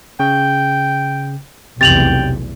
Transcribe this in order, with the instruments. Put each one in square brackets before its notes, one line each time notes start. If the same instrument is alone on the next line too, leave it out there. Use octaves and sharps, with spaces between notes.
[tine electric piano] C#3 [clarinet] G5
[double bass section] F1 B1 E2 [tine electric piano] C3 [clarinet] G5 [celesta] A6 F7 F#7